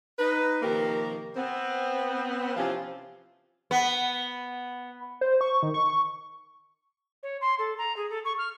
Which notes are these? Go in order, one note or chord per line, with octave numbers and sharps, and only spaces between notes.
D#4 B4
C3 D#3 F3 A#3 G4 A#4
B3 C4
C3 E3 F3 C4 C#4 F4
B3
C5
C#6
D#3
C#6
C#5
C6
A4
A#5
G#4
A4
C#6
F6